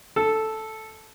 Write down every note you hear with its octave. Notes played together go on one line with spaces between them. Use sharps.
A4